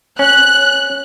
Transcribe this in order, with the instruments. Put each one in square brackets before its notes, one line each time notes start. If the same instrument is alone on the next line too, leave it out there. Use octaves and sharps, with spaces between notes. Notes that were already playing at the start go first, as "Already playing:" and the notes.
[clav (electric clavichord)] C#4 [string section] F#6